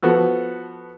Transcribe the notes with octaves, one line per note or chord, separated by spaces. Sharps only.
F3 B3 F#4 A4